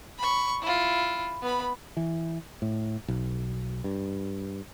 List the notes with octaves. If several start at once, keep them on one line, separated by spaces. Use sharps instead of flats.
B5 C#6
E4 F4
B3 B5
E3
A2
B1
G2